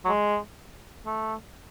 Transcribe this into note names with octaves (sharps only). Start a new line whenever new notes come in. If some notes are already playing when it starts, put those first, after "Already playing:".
F#3
G#3
A3